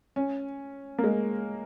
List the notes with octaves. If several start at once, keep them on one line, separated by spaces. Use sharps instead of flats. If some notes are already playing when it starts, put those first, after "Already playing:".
C#4
A#3
G#3